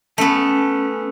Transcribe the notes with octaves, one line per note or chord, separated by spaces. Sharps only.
A3 B3 C#4